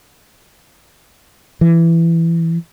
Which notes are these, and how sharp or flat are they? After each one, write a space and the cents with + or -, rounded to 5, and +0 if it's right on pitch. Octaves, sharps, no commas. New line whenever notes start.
E3 +15